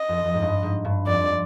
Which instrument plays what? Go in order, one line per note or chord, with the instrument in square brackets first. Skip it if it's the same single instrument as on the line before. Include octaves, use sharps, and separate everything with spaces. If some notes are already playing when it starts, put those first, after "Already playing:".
Already playing: [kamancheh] D#5
[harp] F2
F2
G#2
G2
G#2
G2
[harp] F2 [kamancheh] D5